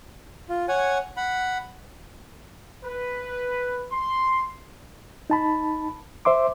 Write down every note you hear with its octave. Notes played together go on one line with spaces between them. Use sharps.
F4
C#5 F#5 G#5
F#5 B5
B4
C6
D#4 A5 B5
C5 E5 C6 D6